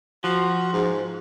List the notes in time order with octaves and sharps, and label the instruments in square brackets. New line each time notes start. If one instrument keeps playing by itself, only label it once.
[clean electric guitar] F3 [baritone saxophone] F#4
[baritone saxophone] G#2